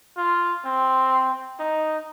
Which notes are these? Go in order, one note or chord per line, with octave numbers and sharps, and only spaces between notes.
F4
C4
D#4